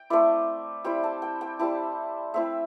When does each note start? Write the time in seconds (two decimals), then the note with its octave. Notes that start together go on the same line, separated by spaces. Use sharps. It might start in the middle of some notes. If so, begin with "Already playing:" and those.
Already playing: G5
0.10 A3 C4 E4 D5
0.84 G3 C4 E4 G5
1.03 A5
1.22 G5
1.41 G5
1.59 G3 C4 E4 A5
2.34 A3 C4 E4 E5